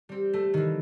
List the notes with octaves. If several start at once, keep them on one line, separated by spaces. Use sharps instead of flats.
G3 C4
A3
D#3 E3